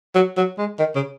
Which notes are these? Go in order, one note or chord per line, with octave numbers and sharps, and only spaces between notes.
F#3
F#3
G#3
D#3
C#3